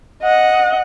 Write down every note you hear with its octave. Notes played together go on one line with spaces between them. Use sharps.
D#5 F#5